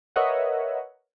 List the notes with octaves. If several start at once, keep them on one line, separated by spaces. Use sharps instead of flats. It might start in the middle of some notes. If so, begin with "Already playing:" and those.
A#4 B4 C#5 D#5 E5 F#5